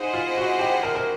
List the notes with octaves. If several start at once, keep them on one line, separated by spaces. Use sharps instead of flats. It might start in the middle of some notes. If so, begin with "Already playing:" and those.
Already playing: D#4 E4 G#4 C5 D#5 F#5
F4
F#4
G4
A#4
A#4